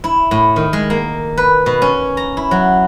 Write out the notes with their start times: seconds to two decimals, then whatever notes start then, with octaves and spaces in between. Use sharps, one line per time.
0.04 E4
0.31 A2
0.56 D#3
0.73 G#3
0.90 A#3
1.37 B4
1.66 B2
1.82 C#4
2.17 A#5
2.37 E4
2.51 F#3